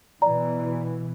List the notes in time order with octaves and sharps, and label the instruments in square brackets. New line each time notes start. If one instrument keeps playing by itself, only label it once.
[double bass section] B2 E3 [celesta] D5 A#5